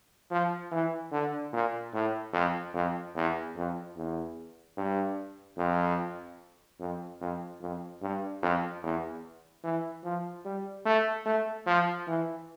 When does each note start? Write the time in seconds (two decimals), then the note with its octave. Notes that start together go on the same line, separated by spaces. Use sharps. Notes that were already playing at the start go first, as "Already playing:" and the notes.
0.31 F3
0.71 E3
1.12 D3
1.53 A#2
1.93 A2
2.33 F2
2.74 F2
3.15 E2
3.56 F2
3.97 E2
4.77 G2
5.58 F2
6.80 F2
7.21 F2
7.61 F2
8.02 G2
8.42 F2
8.83 E2
9.64 E3
10.04 F3
10.45 G3
10.85 A3
11.26 A3
11.67 F3
12.08 E3